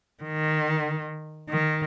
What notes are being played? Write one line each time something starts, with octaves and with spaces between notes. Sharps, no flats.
D#3
D#3